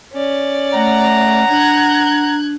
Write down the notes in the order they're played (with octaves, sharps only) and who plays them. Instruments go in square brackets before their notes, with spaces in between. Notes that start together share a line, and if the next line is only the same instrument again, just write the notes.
[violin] C#4 D5
[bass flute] A3 [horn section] F#5 A#5
[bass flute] D4 [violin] F#6 G#6